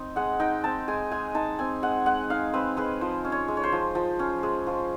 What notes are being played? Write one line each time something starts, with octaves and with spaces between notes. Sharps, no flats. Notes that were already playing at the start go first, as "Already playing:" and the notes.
Already playing: C4 D#4
G#3 F#5
D#4 G5
C4 A5
G#3 G#5
G#3 G#5
D#4 A5
C4 G#5
G#3 F#5
G#3 F#5
D#4 F5
C4 B4
G#3 B4
F3 C5
C#4
C#5
G#3
C#5
C5
F3
F3
C#4
G#3
F3